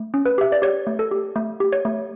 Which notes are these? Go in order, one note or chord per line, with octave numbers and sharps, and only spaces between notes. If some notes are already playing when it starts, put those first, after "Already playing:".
Already playing: A3
C#4
B4
G4 E5
D5
G4 C#5
A3
A4
G4
A3
G4
C#5
A3